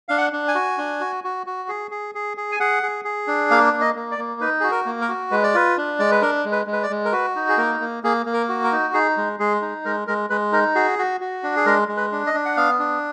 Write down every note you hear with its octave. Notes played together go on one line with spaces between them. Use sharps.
D4 F5
F#5
D4
G#5
F#4
D4
F#4
F#4
F#4
G#4
G#4
G#4
G#4
G#5
G#4 F#5
G#4
G#4
D4
A#3 F5
A#3
D#5
A#3
D5
A#3
D#4 B4
F#4 G#4
A#4
A#3
A#4
F#4
G#3 B4
D5
F4 B4
D4
G#3 D5
B4
D4 A#4
G#3
B4
G#3
B4
D5
G#3
A#4
F#4 B4
D#4
G#4
A#3 A#4
A#3
A#3 G#4
A#3
A#4
F#4
A#4
D#4
D#4 G#4
G#3
G#3 G#4
D#4
G#3 A#4
G#3 A#4
G#3 B4
D#4 A#4
F#4 G#4
F#4
F#4
D4
G#4
G#3 A#4
G#3
B4
D4
D#5
D4
F#5
B3 F5
D4